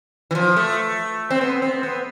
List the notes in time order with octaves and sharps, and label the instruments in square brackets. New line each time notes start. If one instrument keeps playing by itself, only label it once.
[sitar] E3
F3
A3
C4
B3
C4
B3